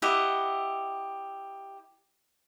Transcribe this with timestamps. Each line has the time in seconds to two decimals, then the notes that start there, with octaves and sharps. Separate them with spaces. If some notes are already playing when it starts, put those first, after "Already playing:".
0.02 E4 G4 D#5 F#5